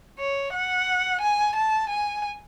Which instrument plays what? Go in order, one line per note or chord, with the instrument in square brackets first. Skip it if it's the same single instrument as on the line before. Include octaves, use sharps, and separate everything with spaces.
[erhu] C#5
F#5
G#5
A5
G#5